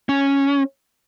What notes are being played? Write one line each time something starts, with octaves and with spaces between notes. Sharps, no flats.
C#4